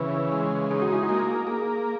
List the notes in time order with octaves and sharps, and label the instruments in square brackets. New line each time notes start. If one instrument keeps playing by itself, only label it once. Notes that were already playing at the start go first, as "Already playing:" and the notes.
Already playing: [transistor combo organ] C#3 E3 [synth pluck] B4
[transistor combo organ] G#3
[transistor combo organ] D#4 [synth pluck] G#4
[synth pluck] F#4
E4
F#4
[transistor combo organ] A#3
[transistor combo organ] A#3 [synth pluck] G#4